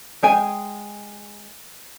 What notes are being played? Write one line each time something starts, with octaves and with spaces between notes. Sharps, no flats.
G#3 G5 G#5